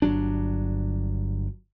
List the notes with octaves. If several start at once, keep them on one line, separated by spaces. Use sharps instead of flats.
G1 F#3 D4